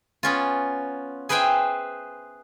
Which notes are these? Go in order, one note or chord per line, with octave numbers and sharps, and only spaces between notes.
B3 C#4 F4
G#4 B4 C5 E5 G5 G#5